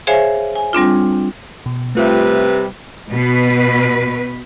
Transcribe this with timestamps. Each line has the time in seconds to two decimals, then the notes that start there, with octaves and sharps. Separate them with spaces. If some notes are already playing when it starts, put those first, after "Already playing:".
0.07 G#4 C5 C#5 E5 F5 G#5
0.55 G#5
0.73 G3 C4 D4 F4
1.66 B2
1.95 C3 G3 A3 F4 B4 E5
3.12 B2 B4